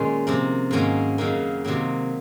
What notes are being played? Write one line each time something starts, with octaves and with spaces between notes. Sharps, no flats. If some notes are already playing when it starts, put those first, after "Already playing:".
Already playing: A#2 D#3 G#3 C#4 C#5
C3 F3 A#3
G#2 D#3 F#3 A#3 C#4
F#2 C#3 F#3 A#3 D#4
C3 D#3 F#3 A#3